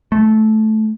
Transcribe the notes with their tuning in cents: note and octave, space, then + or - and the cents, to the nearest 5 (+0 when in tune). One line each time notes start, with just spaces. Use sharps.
A3 -15